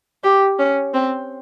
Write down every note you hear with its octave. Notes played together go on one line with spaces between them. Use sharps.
G4
C#4
C4